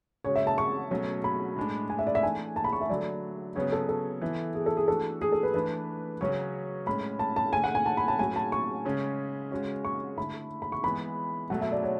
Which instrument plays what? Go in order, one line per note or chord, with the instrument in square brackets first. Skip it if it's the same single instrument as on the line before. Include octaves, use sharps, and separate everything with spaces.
[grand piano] C#3 G#3 C#4 F#4 [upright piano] C#5
[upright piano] E5
A5
C#6
[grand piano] B2 F#3 A3 C#4
[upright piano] B5
[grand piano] A2 G#3 D4
[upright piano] G#5
E5
D5
E5
[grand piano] A2 E3 A3 D4 [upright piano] G#5
[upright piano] A5
B5
C#6
E5
[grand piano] D3 F#3 A3 [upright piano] D5
[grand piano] C#3 F#3 B3 [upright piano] C#5
[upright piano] A4
A4
[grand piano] E3 B3 E4
[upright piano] G#4
A4
G#4
[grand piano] E3 A3 D4 F#4 [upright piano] A4
[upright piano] G#4
A4
B4
[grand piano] E3 A3 D4 [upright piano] B4
[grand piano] C#3 F#3 C#4 F#4 [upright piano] C#5
[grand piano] A2 G#3 C#4 [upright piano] B5
[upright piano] A5
A5
[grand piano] D3 A3 C#4 [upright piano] G#5
[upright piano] F#5
G#5
A5
B5
A5
[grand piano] A2 F#3 C#4 F#4 [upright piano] G#5
[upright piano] A5
C#6
[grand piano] C#3 G#3 C#4
C#3 G#3 C#4 F#4
[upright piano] C#6
[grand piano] D3 A3 E4 [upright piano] B5
[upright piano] B5
C#6
[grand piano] E3 G#3 B3 [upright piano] B5
[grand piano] B2 F#3 A3 [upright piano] F#5
[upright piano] E5
D5
C#5